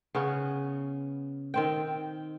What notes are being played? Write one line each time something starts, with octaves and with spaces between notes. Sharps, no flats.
C#3 B3 C#4
D#3 C4 G5